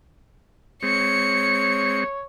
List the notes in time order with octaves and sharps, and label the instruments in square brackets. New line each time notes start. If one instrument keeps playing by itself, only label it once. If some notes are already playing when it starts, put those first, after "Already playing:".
[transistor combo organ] G#3 C4 [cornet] C#5 [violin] C#7